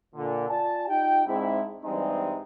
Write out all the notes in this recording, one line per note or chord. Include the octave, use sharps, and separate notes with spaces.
A#2 D3
F4 D5 G#5 A5
D#4 F4 G4 G5
G#2 G#3 C4 D4 E4
G2 E3 G3 G#3 C4 D#4